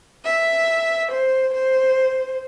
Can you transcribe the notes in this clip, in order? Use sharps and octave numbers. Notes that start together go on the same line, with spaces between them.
E5
C5
C5